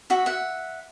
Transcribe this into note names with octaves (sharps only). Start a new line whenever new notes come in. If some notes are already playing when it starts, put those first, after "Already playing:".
F#4 E5 F#5
E5 F#5